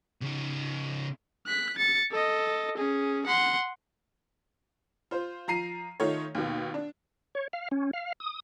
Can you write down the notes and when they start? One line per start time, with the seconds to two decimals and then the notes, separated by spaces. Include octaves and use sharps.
0.21 C#3 D#4
1.47 F#6 B6
1.78 A6 C#7
2.11 A4 D#5
2.77 C#4 G#4
3.26 F#5 C6
5.11 F4 C5
5.48 F3 A#5 C7 D#7
6.00 D#3 A3 D#4 F4 C#5
6.35 D#2 B2
6.74 D4
7.35 C#5
7.53 F5
7.71 C#4
7.93 F5
8.20 D#6